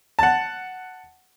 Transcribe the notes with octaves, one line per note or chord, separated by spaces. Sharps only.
F#5 A5